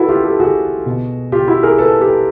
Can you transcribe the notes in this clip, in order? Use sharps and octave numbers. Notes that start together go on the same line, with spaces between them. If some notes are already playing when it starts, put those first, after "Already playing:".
Already playing: E4 F#4 A4 B4
F4 G4
G4 A4
F#4 G#4
B2
F4 G4
E4 F#4
G#4 A#4
A4 B4
G4 A4